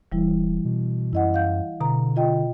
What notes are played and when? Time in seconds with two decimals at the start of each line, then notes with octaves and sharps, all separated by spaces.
0.12 D#1 E3 G3 E4
0.65 B2
1.13 F#2 E4 D#5 F#5
1.34 F5 G6
1.81 B2 D3 A#5
2.16 F4 D#5 G5